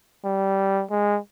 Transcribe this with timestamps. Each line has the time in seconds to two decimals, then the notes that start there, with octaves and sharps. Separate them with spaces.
0.25 G3
0.90 G#3